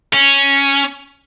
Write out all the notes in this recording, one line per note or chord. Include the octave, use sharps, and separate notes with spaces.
C#4